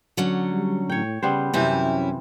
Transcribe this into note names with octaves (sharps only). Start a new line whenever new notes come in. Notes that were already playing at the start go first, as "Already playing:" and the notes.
D3 F#3 C#4
G3
A2 C#5 G5
C#3 G3 B3 C5
F#2 C3 E3 C4 C#4 E4